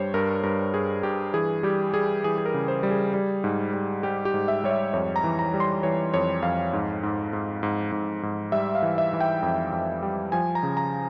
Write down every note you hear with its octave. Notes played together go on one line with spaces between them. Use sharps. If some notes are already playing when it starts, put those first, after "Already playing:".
Already playing: G2 G3 C5 C#5
G2 A#4
G2 A#4
G2 G#4
G2 G4
E3 G#4
G3 G4
G3 G#4
E3 G#4
G#4
A#4
C#3
C5
G3
G#4
G3
G#2
G3
G3 G4
G4
G#2
E5
G3 C#5
E5
F2 C#5
A#5
E3
A#5
G3
C6
E3 C#5
F2 C#5
F2 F5
G#2
G#2
G#2
G#2
G#2
G#2
G3 E5
F5
E3
E5
E3
G5
F2
F2
G3
F3 G#5
A#5
C#3
A#5